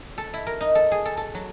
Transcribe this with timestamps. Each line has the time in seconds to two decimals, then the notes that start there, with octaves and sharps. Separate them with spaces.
0.18 A4
0.34 E4
0.47 A#4
0.61 D#4
0.75 A4
0.92 G#4
1.05 A4
1.17 A4
1.35 F#3